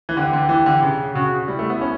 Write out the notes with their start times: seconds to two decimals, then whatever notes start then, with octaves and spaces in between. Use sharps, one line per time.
0.09 E3
0.17 D3 G4
0.33 D3
0.49 E3
0.66 D3
0.82 C#3
1.15 C#3 F#4
1.48 G3 E4
1.59 A3
1.70 B3
1.81 C#4